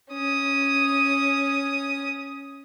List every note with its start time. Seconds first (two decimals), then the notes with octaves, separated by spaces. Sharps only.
0.11 C#4 D#6